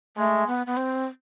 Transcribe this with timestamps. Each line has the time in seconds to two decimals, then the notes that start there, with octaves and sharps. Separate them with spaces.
0.17 G#3 A3
0.47 B3
0.67 B3
0.77 C4